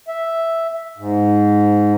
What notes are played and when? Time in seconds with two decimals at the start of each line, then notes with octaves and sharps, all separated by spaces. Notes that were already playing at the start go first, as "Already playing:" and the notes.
0.08 E5
0.98 G#2